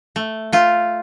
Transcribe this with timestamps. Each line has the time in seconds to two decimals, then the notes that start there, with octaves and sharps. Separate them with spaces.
0.16 A3
0.52 A3 F4